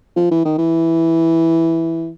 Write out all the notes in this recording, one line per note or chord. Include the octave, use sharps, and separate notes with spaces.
F3
E3
D#3
E3